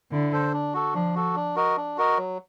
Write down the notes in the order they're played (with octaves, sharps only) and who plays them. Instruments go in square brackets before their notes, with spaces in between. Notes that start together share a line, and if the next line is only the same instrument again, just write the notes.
[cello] D3 [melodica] E4
[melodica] A4 C5
D4
F#4 A4
[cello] F3 [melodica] D4
[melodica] F#4 A4
D4
F#4 A#4 D#5
D4
F#4 A#4 D#5
F#3